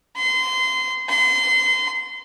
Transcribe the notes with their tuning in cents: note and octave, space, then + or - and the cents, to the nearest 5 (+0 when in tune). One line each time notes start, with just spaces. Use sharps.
C6 -25
C6 -30